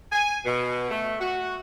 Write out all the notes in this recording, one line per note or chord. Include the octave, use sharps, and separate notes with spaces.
G#5
B2
A3
F#4